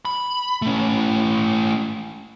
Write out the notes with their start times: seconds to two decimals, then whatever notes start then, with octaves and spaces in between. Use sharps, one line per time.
0.05 B5
0.62 A3 C#4